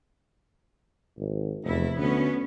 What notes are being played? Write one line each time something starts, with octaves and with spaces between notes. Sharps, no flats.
G#1
F1 E2 E4
D2 B3 C#4